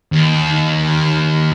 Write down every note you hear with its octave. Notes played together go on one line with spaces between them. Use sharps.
D#2